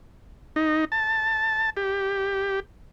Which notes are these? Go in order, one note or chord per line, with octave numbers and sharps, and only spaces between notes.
D#4
A5
G4